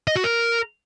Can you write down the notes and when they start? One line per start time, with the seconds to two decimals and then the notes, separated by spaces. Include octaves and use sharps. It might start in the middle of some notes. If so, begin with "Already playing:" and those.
0.08 D#5
0.16 F#4
0.24 A#4